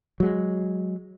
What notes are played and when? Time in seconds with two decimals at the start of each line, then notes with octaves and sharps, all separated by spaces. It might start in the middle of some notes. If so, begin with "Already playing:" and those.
0.20 F#3 G#3